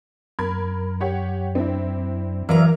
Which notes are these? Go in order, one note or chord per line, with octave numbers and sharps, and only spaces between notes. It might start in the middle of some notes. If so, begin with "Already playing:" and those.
F#2 A#4 B5 G#6
G4 C#5 F#5
C4 D4 E4
E3 F#3 A#4 D5 E5 F5 A#5